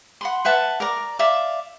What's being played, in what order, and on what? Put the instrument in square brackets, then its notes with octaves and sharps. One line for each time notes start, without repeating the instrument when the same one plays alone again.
[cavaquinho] F#5 B5 C6
B4 E5 F#5 A5
A#4 D5 A#5
D5 E5 F5